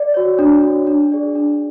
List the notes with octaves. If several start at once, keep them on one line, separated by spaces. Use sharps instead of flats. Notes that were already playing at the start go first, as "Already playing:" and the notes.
Already playing: D5
F#4 C#5
D4
F#4 C#5
D4
G#4 D5
D4